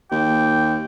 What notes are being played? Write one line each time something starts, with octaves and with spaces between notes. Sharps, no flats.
D#2 G5